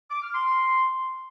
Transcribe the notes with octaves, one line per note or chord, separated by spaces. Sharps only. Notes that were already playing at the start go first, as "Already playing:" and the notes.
D6
F6
C6